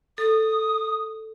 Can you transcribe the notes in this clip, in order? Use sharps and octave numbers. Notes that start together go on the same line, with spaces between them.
A4 D#6